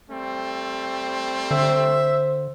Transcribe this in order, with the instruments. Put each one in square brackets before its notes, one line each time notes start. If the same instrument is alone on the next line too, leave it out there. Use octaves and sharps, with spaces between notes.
[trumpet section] G3 A3 C4
[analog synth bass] D3 [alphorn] C5 [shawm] E5